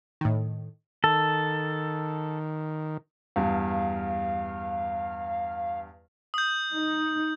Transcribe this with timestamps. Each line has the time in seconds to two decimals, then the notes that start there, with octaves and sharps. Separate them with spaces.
0.21 A2 D#3
1.04 D#3 A4
3.36 E2 G2 F5
6.34 D#6 G6
6.74 D#4